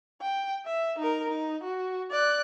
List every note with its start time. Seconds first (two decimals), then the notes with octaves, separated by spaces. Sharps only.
0.21 G5
0.65 E5
0.98 D#4 A#4
1.29 D#4
1.63 F#4
2.11 D5 F#6